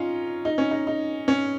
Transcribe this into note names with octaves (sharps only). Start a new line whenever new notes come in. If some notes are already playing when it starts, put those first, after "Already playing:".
Already playing: C#4 D#4 F4
D#4
C#4
D#4
D#4
C#4